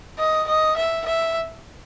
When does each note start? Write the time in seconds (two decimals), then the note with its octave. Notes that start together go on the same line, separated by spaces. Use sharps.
0.19 D#5
0.48 D#5
0.77 E5
1.06 E5